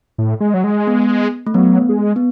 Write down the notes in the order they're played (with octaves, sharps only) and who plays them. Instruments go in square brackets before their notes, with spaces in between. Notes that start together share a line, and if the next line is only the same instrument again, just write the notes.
[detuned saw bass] A2
G#3
F#3
G#3
[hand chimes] B3
A3
[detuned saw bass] F#3 [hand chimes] B3
[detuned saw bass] G#3
[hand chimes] B3